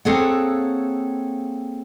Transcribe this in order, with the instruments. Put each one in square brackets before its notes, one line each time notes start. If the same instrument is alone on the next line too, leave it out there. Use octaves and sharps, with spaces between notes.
[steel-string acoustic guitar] A#3 C4 G#4 A4 C#5 F#5